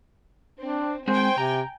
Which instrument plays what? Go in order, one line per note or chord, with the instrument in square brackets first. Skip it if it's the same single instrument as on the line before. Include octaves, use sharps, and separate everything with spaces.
[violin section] C4 [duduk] D4
[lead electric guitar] G#3 C4 [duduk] C5 [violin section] G5 G#5
[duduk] C3 [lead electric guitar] A#5